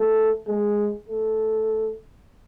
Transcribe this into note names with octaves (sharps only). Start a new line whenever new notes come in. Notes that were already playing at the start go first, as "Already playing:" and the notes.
Already playing: A3
G#3
A3